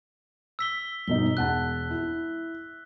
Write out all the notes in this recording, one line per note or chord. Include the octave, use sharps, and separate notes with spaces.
E6 B6 G7
G1 B2 D#4 G7
E1 F#5 A5 F#6
E4